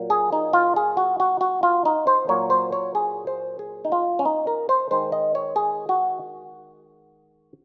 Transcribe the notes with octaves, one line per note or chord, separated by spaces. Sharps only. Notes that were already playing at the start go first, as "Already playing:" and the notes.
Already playing: A#2 F#3 A#3
G#4
D#4
F4
G#4
F#4
F#4
F#4
F4
D#4
C5
A#2 F#3 A#3 C#5
C5
C#5
G#4
C5
G#4
D#4
F4
C#4
D#4
A#4
C5
D#3 G#3 C5
D#5
C#5
G#4
F#4